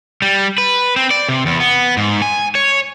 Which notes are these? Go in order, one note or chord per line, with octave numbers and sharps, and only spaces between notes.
G3
B4
C4
D5
C3
E2
B3
G#2
G#5
C#5